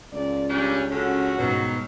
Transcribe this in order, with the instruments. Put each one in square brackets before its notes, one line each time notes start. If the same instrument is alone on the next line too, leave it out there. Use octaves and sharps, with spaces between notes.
[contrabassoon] C#2 [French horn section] A#2 D5
[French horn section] A#2 C#4 [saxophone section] G3 D4 G4
[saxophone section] D3 A3 C#4 [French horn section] F#4
[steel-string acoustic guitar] G#2 B2 [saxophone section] D#3 F#3